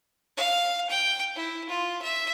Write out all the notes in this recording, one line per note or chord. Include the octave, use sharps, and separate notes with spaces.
F5
G5
E4
F4
E5